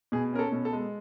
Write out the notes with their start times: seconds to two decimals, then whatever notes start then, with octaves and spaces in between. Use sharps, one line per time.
0.12 B2 G#4
0.33 C#4 A#4
0.39 A4
0.52 B2
0.65 A4
0.73 G#3